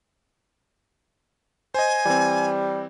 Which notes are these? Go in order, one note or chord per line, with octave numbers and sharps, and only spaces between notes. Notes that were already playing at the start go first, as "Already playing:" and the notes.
C5 D#5 G#5
E3 G3 C4